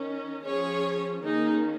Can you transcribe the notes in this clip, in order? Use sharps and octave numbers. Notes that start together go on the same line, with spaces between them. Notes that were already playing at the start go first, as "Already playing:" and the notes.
Already playing: D#3 C#4
F3 C#4 G#4 C#5
D#3 A#3 C#4 D#4 G#4